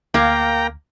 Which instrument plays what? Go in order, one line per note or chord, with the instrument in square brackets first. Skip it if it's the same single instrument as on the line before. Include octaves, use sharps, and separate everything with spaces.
[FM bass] D2 [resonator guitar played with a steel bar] A#3 A#4 F5 [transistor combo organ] G5 A#5